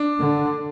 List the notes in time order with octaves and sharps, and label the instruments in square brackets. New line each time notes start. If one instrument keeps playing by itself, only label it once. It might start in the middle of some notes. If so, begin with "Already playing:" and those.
Already playing: [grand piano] D4
[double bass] D3